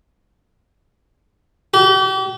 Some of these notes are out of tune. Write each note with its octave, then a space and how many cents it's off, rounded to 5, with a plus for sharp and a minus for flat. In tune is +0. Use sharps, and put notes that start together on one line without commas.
G4 -40